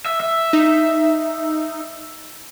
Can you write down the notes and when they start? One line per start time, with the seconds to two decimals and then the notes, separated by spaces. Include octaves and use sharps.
0.06 E5
0.20 E5
0.53 D#4